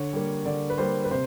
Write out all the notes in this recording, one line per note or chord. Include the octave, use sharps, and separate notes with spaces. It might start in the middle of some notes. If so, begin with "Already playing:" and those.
Already playing: D3 C#5
G3 A#3
D3 D5
B4
G3 A#3 C5
B4
C3 C5